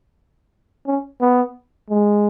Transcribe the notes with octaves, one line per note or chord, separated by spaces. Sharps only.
C#4
B3
G#3